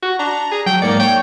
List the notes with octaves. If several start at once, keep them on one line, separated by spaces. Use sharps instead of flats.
F#4
D4 A#5
G#4
F#3 G5
G#2 A#3 D5 C#7
C#5 G5